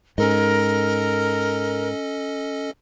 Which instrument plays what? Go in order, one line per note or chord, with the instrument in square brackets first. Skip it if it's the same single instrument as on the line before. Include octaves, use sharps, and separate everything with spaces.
[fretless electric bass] G#2 [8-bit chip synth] C#4 A4 D#5 [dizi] A#4